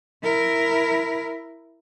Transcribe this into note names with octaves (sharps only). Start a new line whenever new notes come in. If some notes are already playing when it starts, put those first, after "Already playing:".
E4 A#4